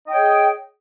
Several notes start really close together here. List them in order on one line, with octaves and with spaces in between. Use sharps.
D#5 G5 C#5 G#4